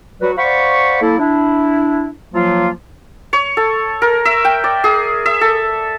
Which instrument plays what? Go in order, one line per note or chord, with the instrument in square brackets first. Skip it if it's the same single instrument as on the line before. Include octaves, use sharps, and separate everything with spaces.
[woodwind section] F#3 G3 F#4 B4
C5 D5 F5 F#5 B5 C#6
F#3 A#3 E4 A4
D4 E4
F3 F#3 A#3 F4
[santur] C#5
A4
A#4
E5
G5
D5
G#4
E5
A4